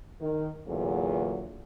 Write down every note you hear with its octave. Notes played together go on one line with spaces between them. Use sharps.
D#3
E2 A#2 D3 F#3